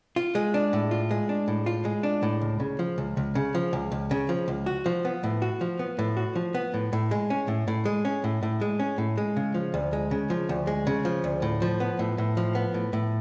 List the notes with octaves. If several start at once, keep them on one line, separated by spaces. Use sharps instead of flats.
F4
G#3
D4
A2
F4
G#3
D4
A2
F4
G#3
D4
A2
C#2
C#3
F3
C#2
C#2
C#3
F3
C#2
C#2
C#3
F3
C#2
F#4
F3
B3
A2
F#4
F3
B3
A2
F#4
F3
B3
A2
A2
G#3
C#4
A2
A2
G#3
C#4
A2
A2
G#3
C#4
A2
G#3
C#3
F3
D2
G#3
C#3
F3
D2
G#3
C#3
F3
D2
A2
F3
B3
A2
A2
F3
B3
A2
A2